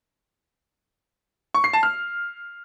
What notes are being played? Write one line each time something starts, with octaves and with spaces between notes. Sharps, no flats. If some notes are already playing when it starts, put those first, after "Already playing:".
C#6
C7
A5
F6